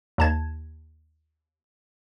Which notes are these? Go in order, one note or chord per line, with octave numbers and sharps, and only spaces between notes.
D#2 A5 G#6